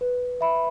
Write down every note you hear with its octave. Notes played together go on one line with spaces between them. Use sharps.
B4
E5 B5